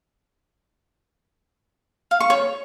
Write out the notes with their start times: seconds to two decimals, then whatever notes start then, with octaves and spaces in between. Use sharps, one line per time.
2.11 F5
2.20 C#6
2.30 C#5